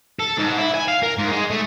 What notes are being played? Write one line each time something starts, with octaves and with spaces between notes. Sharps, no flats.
A4
G#2
E4
G#5
F5
A#4
G#2
G#3
A3